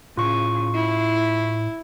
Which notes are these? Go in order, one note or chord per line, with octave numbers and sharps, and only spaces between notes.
A2 C#3 F4 C#6
E4